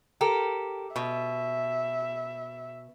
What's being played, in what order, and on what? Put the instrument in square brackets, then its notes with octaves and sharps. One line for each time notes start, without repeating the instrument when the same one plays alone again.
[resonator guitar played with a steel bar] G4 A4 A#4
[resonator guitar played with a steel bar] B2 [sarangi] E5